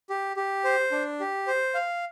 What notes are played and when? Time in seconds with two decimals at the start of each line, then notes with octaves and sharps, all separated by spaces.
0.10 G4
0.37 G4
0.64 C5
0.92 D4
1.20 G4
1.47 C5
1.74 F5